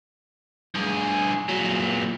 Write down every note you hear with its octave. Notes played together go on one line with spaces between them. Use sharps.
G2 G#4
A#2 F#3